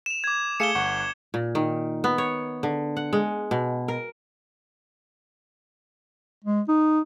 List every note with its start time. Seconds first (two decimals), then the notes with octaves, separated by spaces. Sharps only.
0.06 E7 F7
0.24 D6 G#6
0.60 A3 G#4 F5 C#7 E7 G7
0.75 G1 F#5 C#6
1.34 A#2
1.55 D#3
2.04 B3
2.18 C#5
2.63 D3
2.97 F#5
3.13 G#3
3.51 B2
3.88 A#4
6.45 G#3
6.68 D#4